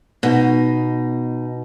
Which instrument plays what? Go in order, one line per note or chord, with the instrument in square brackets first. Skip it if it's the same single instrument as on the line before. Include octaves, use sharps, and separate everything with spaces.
[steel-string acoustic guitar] B2 D#4